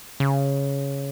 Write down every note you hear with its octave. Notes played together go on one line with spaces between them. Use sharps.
C#3